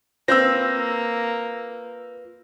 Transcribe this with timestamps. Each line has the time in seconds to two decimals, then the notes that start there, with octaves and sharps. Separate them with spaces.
0.28 A#3 C4 F4 B4 E6 G6 A#6